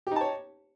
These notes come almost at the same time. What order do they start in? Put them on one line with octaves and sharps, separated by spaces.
G4 D#4 A5 C#5